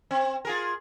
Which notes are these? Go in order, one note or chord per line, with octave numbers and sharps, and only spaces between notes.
C4
F4 G#4 A#4